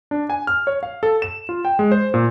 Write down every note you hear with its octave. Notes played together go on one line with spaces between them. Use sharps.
D4
G#5
F6
C#5
F5
A4
E7
F4
G5
G#3
C5
A#2